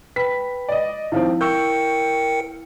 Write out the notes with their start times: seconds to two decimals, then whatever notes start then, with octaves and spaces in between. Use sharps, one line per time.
0.16 B4 G5 B5 B6
0.69 D5 D#5
1.12 D#3 F3 C4 E4 E5 F5
1.41 A#4 G5 C#6 E6 G6 C#7